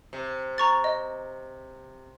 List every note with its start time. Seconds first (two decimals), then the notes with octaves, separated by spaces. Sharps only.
0.13 C3
0.58 A#5 C#6 A6
0.84 D#5